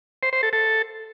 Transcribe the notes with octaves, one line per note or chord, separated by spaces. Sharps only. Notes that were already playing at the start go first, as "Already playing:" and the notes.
C5
C5
A4
A4